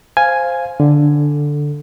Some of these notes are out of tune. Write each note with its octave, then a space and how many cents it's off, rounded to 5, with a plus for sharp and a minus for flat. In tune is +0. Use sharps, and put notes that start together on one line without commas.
C5 +0 F5 +0 G#5 +0
D3 +0 A4 +0